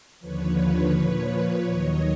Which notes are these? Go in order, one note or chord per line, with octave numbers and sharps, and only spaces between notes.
D#2 D3 F3 B4 C#5
A#2 F3 B4 C#5
B4 C#5
D#2 D#3 F#3 C#5 D#5